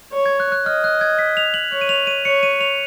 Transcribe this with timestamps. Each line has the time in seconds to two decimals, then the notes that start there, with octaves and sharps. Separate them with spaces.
0.12 C#5
0.26 G#6
0.40 F#6
0.52 F#6
0.65 D#5 F6
0.84 F#6
1.01 G#6
1.19 B6
1.37 F7
1.54 F#7
1.72 C#5 F#7
1.81 D#7
1.89 F7
2.07 D#7
2.25 C#5 C#7
2.43 D#7
2.61 F7